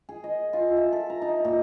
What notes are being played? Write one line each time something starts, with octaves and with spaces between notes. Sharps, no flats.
G#4
D#5
F4
E5
A4
A#5
D#4
A#2